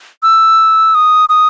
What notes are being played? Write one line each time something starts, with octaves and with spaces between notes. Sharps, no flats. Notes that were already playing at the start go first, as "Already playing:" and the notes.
E6
D#6
D#6